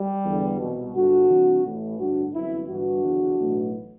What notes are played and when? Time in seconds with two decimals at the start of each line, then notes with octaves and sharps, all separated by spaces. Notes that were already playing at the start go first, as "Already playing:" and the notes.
Already playing: G3
0.25 E2 D3
0.59 C2 B2
0.94 G1 G2 D3 D4 F#4
1.29 C2 C3 E3
1.64 A1 A2 E3
1.98 A1 G2 D3 D4 F#4
2.33 G1 F#2 E3 C4 E4
2.68 G1 G2 E3 D4 F#4
3.03 F#1 E2 D3
3.38 B1 A2 E3